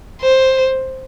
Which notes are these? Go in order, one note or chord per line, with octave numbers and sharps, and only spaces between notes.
C5